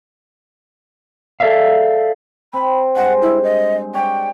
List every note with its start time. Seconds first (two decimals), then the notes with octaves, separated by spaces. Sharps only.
1.40 G#4 A4 B4 D5 E5 F5
2.53 C4 B5
2.96 G2 G#3 C5 F#5
3.22 E4
3.43 D#5
3.94 C#5 D5 F#5 G5